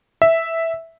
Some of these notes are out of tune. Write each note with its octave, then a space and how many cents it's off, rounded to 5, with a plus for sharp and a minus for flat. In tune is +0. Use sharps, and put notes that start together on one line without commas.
E5 -5